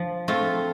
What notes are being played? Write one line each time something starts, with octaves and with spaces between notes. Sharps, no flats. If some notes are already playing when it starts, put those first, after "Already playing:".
Already playing: F3
A3 C4 F4